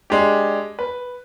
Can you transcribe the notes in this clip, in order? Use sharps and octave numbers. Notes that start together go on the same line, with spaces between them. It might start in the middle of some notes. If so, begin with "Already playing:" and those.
G#3 D4 G4
B4